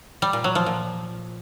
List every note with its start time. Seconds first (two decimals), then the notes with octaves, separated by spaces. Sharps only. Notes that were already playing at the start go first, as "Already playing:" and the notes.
0.22 G3
0.33 A#2
0.44 F#3
0.55 F3
0.66 A#2